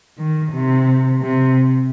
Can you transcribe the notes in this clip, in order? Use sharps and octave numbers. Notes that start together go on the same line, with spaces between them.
D#3
C3
C3